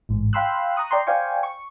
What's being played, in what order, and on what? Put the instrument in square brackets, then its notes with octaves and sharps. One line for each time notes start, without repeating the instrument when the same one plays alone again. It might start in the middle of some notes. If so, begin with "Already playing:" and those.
[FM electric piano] A1 G#2
F5 G5 B5 C6 E6 F#6
A#5 C#6 D#6 F#6
D5 G5 A#5 C6
C5 D5 F5 G5 G#5 C#6
C#6